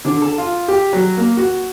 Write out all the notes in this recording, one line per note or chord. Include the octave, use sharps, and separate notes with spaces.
D3
A4
F4
G4
F#3
A#3
F#4